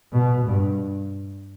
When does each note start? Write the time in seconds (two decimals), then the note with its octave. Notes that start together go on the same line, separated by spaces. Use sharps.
0.12 B2
0.45 G2